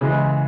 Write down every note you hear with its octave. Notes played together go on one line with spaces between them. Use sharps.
C#3 E3 G#3